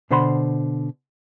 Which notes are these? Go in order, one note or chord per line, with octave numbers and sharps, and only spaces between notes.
B2 D3 C5 F#5 B5 C6